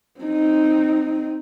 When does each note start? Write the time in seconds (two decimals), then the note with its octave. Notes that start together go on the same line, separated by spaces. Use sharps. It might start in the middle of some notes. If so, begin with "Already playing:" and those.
0.20 C4 D#4